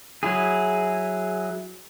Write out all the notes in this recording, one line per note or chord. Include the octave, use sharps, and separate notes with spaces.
F#3 E4 G#4